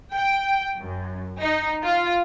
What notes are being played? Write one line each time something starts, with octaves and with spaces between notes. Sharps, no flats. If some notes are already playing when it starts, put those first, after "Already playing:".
G5
F#2
D#4
F4